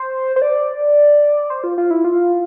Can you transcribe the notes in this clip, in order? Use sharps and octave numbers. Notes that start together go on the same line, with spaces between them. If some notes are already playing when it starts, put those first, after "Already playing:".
Already playing: C5
C5
D5
C5
F4
F4
E4
F4